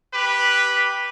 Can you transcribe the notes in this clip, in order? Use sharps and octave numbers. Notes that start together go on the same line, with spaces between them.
G4 B4